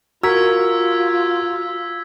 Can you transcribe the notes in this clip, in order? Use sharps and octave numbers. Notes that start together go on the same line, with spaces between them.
F4 F#4 A#4 E6 G#6 B6